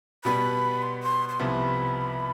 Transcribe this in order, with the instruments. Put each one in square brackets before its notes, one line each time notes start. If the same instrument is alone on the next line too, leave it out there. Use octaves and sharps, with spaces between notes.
[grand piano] B2 G3 B3 [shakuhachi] B5
[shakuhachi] C6
C6
C6
[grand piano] C2 C3 F3 B3 E4 [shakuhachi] B5